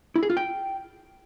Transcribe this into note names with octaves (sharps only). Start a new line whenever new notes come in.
E4
G#4
F4
G5